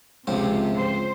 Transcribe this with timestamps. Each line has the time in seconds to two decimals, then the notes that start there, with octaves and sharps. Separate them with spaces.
0.27 C#2 C3 F3 C4
0.77 C5